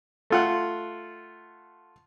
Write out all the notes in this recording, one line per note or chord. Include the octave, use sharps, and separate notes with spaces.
A3 F4 F#5